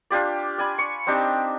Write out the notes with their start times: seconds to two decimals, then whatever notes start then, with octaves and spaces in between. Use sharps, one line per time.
0.10 D4 F4 G4 D5
0.58 D5 G#5 B5
0.78 C#6
1.07 C4 D4 D#4 G4